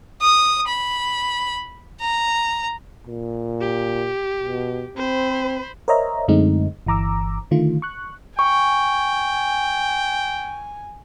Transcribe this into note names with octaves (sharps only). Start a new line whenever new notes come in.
D#6
B5
A#5
A#2
G4
B2
C4 C5 B5
A#4 C5 C#5 D#5 E5 A#5
F#2 D3 G#3 A3 C4 D#4
G1 E3 A#5 D6 E6
D3 D#3 A3 F4
C#6 F#6
G5 G#5 C#6